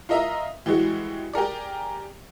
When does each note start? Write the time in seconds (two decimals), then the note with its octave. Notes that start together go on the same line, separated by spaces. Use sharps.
0.09 F4 A#4 D#5 E5 A#5
0.66 E3 G3 G#3 F#4
1.33 G4 G#4 A#4 D5